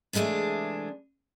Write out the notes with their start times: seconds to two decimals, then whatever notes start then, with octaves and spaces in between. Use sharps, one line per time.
0.13 C3 E3 G#3 A3 D4